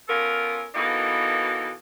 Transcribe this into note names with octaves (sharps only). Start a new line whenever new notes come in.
B3 C#4 F4 A4 A#4
B2 E3 A#3 D#4 F#4 A4